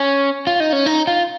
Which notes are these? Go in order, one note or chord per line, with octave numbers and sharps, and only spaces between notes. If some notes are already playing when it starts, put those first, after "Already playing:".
Already playing: C#4
F4
D#4
C#4
D#4
F4